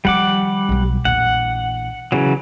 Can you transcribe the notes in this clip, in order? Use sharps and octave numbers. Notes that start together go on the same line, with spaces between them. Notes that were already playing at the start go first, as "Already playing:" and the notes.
D#3 F3 G3 F#5 D6
B1 F#3
A#1 E2 F#5
C#3 E3 F#3